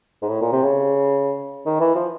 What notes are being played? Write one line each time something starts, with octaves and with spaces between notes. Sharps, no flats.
G#2
A2
A#2
C3
C#3
D#3
E3
F3